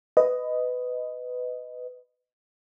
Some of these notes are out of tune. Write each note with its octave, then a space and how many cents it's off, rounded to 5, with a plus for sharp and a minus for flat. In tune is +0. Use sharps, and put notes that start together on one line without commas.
B4 +20 D#5 +0